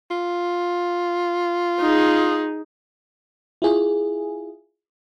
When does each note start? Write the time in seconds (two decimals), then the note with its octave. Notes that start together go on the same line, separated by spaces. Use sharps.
0.11 F4
1.81 D#4 G#4
3.62 E4 F4 G#4